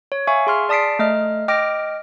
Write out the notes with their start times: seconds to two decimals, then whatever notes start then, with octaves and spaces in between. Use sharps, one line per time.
0.12 C#5
0.27 E5 F5 G#5 C#6
0.47 G#4 C6 F6
0.69 D5 A5 D#6 B6 C7 D7
0.99 A3 D#5 F6
1.48 D#5 G5 D6 F6 A#6 D7